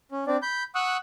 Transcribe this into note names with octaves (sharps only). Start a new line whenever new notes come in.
C#4
C4 D4 D5
B5 G6
F#5 C#6 D#6 E6 F#6